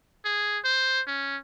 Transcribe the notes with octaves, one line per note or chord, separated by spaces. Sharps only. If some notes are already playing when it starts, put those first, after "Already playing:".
G#4
C5
C#4